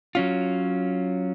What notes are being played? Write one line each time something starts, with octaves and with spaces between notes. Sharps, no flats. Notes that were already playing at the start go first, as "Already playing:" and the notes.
F#3 C#4 F4